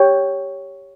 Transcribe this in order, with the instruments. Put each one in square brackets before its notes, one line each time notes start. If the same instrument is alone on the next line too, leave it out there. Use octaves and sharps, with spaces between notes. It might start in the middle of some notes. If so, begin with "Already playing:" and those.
Already playing: [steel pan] G4 C#5 G5